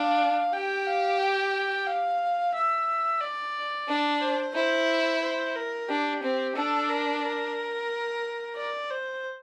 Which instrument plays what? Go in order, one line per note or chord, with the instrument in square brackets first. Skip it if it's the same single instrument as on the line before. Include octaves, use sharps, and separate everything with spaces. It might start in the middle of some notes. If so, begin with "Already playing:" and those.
Already playing: [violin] D4 [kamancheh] F5
[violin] G4 [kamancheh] G5
[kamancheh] F5
G5
F5
E5
D5
[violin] D4
[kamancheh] C5
[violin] E4 [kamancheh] C5
[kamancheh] C5
A#4
[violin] D4 [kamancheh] G4
[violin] C4
[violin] D4 [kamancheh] A4
[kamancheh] A#4
A#4
D5
C5